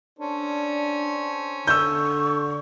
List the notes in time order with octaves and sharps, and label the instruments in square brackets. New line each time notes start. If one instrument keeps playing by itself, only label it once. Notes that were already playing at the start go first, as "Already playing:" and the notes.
[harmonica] C#4 A4 C5 [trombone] D4
[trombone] D3 [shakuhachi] C#6 [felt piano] E6 G6